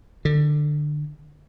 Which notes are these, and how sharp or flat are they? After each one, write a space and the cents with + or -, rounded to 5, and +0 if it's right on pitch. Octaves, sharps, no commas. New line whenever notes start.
D3 +20